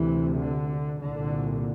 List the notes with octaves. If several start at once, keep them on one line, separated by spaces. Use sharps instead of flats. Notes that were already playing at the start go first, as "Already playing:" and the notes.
Already playing: D2 C3 E3
D3
C2 A#2 D3